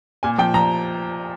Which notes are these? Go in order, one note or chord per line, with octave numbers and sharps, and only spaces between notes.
A#2 G#5
F3 G5
F3 A#5